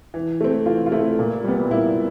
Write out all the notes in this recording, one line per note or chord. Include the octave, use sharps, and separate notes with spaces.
E3
A3 C4
E3 F4
F4
A3 C4 E4
A#2
G3 B3
A#2 E4